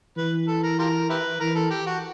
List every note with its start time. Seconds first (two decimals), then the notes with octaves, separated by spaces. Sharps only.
0.17 E3 B4
0.48 A4
0.63 A#4
0.79 F4 G4 A#4
1.10 E4 G4 B4
1.40 E3 A#4
1.55 A4
1.71 G4
1.86 F#4